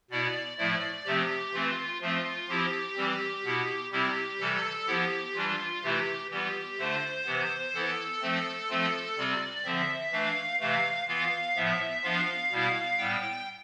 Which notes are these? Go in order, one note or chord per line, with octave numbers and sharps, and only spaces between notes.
B2 B3 E4 D5
A2 F3 A3 E4 D5
C3 F3 A3 C4 G4
E3 A3 C4 F4
F3 A3 C4 F4
F3 C4 E4 G4
E3 G3 C4
B2 B3 E4
C3 G3 C4 E4 G4
C3 E3 G3 A4
F3 B3 E4 G4
E3 G3 D4 F4
C3 E3 A3 E4 G4
E3 G3 B3 F4 G4
D3 A3 D4 F4 C5
C3 E3 B3
E3 B3 E4 A4
F3 A3 C4
F3 A3 C4 F4
C3 G3 C4 F4 D5
D3 F3 C4 E5
E3 A3 D4 F5
C3 E3 A3 F5
E3 B3 F4 F5
A2 F3 B3 E5
F3 B3 D4 F4 F5
B2 G3 B3 E4
A2 G3 B3 G5